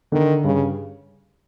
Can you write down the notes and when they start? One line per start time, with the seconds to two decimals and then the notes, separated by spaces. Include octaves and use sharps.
0.12 D3 D#3
0.44 G2 C#3